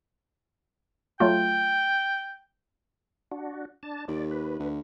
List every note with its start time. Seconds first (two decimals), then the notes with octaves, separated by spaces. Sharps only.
1.20 F#3 A3 F4 G5
3.31 D4 F#4
3.83 D4 A5
4.08 D#2 D5
4.31 B4
4.59 D2